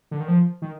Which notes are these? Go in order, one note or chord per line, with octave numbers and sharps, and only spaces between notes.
D3
D#3
F3
D#3